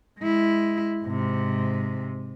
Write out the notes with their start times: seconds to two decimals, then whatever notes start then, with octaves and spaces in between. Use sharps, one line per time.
0.19 G#3 E4
1.03 G#2 C3